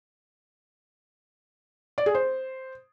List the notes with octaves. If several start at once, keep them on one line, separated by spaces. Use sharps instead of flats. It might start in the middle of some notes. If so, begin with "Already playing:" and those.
D5
G#4
C5